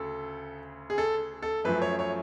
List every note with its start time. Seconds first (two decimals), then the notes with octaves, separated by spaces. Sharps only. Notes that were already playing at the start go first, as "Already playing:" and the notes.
Already playing: D2 C#3 A4
0.90 G#4
0.98 A4
1.42 A4
1.65 F#2 F3 A3 B4
1.82 C#5
1.99 C#5